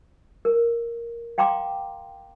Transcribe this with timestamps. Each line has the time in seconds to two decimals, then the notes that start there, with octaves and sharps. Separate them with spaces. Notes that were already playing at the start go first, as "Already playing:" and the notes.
0.45 A#4
1.38 F5 G5 A#5 C6 D6